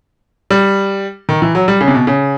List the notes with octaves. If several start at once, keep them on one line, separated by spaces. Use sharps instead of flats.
G3
D#3
E3
F#3
G3
C#3
C3
B2
C#3